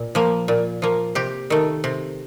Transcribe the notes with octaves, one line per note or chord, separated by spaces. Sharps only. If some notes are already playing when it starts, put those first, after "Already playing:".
Already playing: A#2
F3 A#3
A#2
F3 A#3
C3 G4
D#3 A3
C3